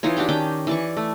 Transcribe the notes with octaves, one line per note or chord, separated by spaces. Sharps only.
E3 D#4 F4 C#5
D4 F#4 G4 G5
D#3 C#4 G5 D6
E3 D5 C#6
A3